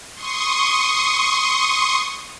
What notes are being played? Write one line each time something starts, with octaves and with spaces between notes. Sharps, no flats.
C6 C#6 D#6